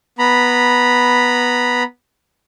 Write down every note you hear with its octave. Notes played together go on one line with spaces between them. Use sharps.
B3 A#5 B5